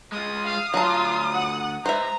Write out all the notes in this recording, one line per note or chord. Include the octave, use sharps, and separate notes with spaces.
G#3 F4 D#6
F5 F6
D2 F#3 F4 F5 A5 A#5
F#5
G#3 B4 C5 E5 A#5